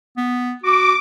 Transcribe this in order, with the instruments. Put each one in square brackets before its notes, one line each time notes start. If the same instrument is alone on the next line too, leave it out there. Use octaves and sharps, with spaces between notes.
[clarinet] B3
[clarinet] F#4 [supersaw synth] D6